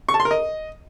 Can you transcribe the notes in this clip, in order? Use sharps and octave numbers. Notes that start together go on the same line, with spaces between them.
C#6
A5
C6
A#4
D#5